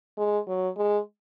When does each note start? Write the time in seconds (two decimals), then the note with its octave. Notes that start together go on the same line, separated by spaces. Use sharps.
0.17 G#3
0.48 F#3
0.77 G#3